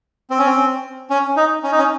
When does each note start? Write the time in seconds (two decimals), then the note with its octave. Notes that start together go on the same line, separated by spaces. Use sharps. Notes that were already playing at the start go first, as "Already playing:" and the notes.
0.30 C4
0.39 C#4
0.46 C4
1.10 C#4
1.37 D#4
1.64 C#4
1.72 D#4
1.78 C#4